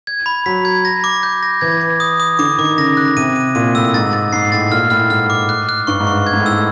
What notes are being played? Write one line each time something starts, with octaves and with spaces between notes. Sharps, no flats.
G#6
B5
F#3 B6
G#6
A#6
D6
G6
A#6
E3 G#6
G#6
D#6
D#6
D3 D6
D#3 D6
C#3 A#6
F#6
C3 D#7
D#7
A#2 D#7
A2 E6
G#2 A6
A6
G#2 C7
A2 A6
A#2 F6
A2 F6
G#2 F6
D6
F#6
F#6
G2 C#6
G#2
C#6
G#6
G#2
A2
E6
A2